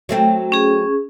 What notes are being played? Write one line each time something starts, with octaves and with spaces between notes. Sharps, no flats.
F#3 A3 C4
C#4 G#4